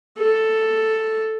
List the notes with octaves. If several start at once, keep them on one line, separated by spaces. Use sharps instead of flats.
A4